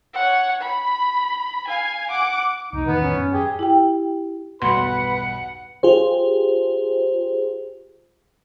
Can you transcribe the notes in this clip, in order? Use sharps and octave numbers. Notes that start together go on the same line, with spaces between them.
C#5 F#5
B5
F5 G#5
F#5 D6
F#1 C2 D#4
E2 A2 D#3 B3
C#4
F#2
G4 G#4
E4 G4 G5
B1 E2 G2 B4 F#5 B5 C6
F4 G4 G#4 C5